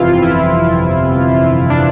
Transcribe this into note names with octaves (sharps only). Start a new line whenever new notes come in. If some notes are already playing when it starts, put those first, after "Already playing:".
Already playing: G1 F2 C3 E3 E4 F4
F4
E4
D4